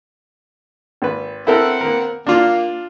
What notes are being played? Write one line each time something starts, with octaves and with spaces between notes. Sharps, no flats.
G#1 B4
B3 C4 E4 A4 A#4 F#5
A#3 A#4
A#3 D4 F4